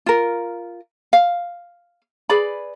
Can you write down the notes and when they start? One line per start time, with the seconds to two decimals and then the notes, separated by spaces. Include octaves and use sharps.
0.06 F4 A#4
1.13 F5
2.29 G#4 B4 D5 B5